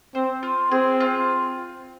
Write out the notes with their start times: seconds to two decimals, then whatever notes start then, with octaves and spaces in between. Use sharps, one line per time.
0.15 C4 C5
0.43 F4
0.71 C4 G#4
1.00 F4